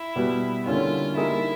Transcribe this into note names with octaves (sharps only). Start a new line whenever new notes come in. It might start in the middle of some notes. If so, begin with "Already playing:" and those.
Already playing: E4
B2 G3 B3
D3 G3 A#3 C#4 E4 F4
G3 A#3 D#4 E4 G#4